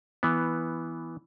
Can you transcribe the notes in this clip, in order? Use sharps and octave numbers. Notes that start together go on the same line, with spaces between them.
E3 B3